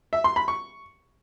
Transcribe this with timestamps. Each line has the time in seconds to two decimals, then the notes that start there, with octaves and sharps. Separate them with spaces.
0.13 E5
0.24 C6
0.36 B5
0.48 C#6